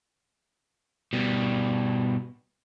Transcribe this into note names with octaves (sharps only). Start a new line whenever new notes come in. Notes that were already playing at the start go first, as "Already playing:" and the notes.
B2 G3